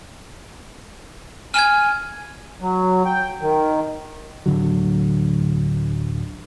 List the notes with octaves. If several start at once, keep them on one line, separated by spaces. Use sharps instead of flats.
G#5 F6 G#6
F#3
G5
D#3
D1 C2 D3 F#3